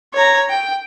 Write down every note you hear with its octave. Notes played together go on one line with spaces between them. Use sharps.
C#5 A#5
G5